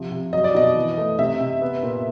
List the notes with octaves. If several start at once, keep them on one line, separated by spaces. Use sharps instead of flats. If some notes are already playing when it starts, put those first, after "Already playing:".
Already playing: C3 F3
C3
F#3 D#5
D5
B2 D#5
E3
A3
C3 E5
C3
B3
A#2